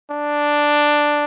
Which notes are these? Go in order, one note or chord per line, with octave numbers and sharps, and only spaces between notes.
D4